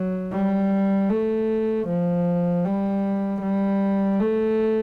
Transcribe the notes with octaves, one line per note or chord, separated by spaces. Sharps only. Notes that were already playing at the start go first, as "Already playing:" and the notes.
Already playing: F#3
G3
A3
F3
G3
G3
A3